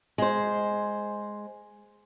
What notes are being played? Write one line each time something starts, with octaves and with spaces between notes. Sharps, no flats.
G#3 C5